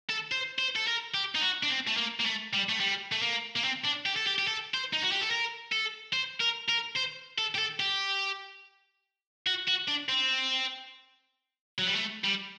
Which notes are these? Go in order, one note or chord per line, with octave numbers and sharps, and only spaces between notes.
A4
C5
C5
A4
A#4
G4
D#4
F#4
D4
C4
A3
A#3
A#3
A3
G3
A3
G3
A3
A#3
A#3
C4
D4
G4
A4
G4
G4
A4
C5
D#4
F#4
G4
A4
A#4
A4
C5
A#4
A#4
C5
A4
G4
A4
G4
F#4
F#4
D4
C4
F#3
G3
A3
G3